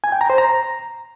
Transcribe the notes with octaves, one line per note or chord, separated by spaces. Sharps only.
G#5
G5
A#5
C5
A#5